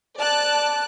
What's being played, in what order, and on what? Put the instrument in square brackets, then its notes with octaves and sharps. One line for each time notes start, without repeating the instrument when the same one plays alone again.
[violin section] D5 A5 F#6